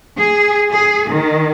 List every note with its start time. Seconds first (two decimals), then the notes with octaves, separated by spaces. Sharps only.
0.18 G#4
0.71 G#4
1.09 D#3